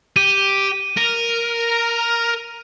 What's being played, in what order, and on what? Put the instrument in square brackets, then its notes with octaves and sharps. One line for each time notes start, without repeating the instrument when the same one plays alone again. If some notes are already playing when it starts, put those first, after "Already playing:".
[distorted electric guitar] G4 [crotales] D#7
[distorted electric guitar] A#4